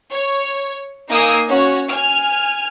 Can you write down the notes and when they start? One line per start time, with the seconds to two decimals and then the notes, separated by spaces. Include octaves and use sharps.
0.12 C#5
1.09 A#3 D#4 G#5 D#6 E6
1.48 C#4 F#4 C#5
1.90 G#5 F6